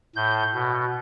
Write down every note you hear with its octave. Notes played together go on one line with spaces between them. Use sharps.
A2 G6
B2